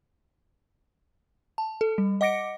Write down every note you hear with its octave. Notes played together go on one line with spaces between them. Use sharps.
A5
A4
G3
D#5 F#5 D6 A#6 C#7 D7